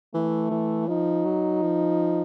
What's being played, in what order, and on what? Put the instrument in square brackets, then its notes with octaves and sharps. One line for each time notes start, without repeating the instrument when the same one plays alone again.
[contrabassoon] E3 [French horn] A3
[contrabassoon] E3
[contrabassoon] F3 [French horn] D#4
[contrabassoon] F#3
F3